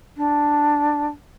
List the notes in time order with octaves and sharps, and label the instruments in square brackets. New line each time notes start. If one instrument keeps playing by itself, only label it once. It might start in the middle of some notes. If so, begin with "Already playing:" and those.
[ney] D4